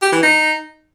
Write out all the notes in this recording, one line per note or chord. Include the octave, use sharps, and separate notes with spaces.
G4
E3
D#4